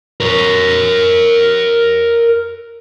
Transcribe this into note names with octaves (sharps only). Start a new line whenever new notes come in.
A#4 C#5